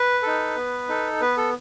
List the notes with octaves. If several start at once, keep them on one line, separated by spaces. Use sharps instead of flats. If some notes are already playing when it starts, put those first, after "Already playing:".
Already playing: B4
D#4 A4
B3
D#4 A4
B3 B4
A4